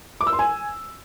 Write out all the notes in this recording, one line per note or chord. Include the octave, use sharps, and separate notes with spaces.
D6
E6
C6
G#5